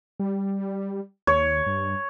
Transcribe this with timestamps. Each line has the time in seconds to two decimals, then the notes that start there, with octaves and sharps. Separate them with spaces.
0.20 G3
1.27 D#2 C#5
1.67 G2